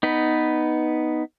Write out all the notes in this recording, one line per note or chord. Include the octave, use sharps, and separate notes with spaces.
B3 D#4 B4